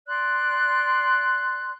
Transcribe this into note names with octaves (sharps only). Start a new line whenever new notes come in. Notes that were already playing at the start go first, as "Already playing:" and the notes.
D5 C6 F#6